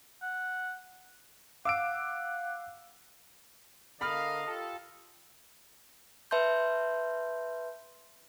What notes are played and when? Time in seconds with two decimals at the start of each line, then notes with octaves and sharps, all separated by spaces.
0.22 F#5
1.65 F5 F#5 D6 E6 D7
4.01 D3 A#4 D#5 F5 B5 F6
4.46 F4 G4 A4
6.31 B4 E5 A5 C6 G6